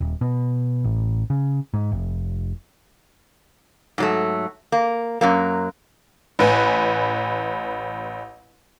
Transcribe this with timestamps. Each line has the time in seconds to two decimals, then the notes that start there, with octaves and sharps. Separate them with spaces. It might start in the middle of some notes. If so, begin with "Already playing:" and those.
0.01 D#1
0.21 B2
0.84 A1
1.30 C#3
1.74 G#2
1.92 F1
3.98 G#2 F#3 A3
4.72 A#3
5.21 F#2 F#3 A#3
6.39 A1 B4 G#5